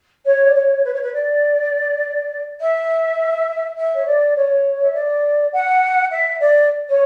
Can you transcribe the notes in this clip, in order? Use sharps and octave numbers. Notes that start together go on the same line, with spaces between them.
C#5
D5
C#5
B4
C#5
B4
D5
E5
E5
C#5
D5
C#5
E5
D5
F#5
E5
D5
C#5